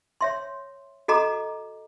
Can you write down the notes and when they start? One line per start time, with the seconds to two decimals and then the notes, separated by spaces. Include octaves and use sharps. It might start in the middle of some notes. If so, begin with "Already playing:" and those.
0.21 C#5 E5 C6
1.08 F#4 A4 D#5 A#5 D6